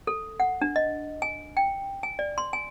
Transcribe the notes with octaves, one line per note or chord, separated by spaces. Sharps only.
A4
F#5
D4
D#5
G#5
G5
G#5
D5
C6
G#5